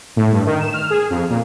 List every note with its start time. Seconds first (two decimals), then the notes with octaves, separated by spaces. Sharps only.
0.16 A2
0.32 G2
0.46 D#3
0.61 E7
0.74 F6
0.90 G#4
1.10 F2
1.30 A#2